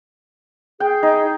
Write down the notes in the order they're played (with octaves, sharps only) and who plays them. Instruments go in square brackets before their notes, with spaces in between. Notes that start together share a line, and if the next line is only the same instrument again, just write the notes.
[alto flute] G#4 [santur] G5
[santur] D#4